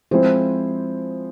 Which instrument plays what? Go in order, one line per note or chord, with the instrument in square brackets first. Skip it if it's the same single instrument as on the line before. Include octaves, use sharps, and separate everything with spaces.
[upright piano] F3 G#3 C4 E4 [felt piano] C5